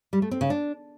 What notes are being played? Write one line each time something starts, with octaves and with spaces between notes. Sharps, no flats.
G3
A3
C4
C#3
D4